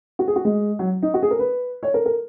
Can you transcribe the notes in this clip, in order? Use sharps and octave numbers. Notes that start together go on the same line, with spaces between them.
F#4
G#4
F#4
G#3
F#3
D#4
F#4
G#4
A#4
B4
C#5
A#4
A#4